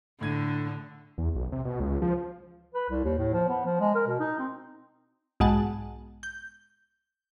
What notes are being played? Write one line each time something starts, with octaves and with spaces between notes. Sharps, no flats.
A2 D3 G#6 D#7
E2
B1
C3
B2
C#2
F3
B4
C2
D#2
A2
F3
B3
F3
G#3
A#4
B2
D#4
C4
B1 G#2 G#3 F#5 A5
G6